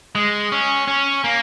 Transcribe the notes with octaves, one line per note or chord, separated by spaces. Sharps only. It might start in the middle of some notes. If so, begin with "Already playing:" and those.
G#3
C#4
C#4
A#3